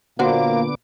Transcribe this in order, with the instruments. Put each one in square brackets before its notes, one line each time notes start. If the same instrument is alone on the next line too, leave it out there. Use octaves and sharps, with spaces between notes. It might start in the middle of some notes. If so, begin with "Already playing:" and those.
[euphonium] A#2 [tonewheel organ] D3 B3 D6 [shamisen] F#3 F#4 C5 [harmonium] A#3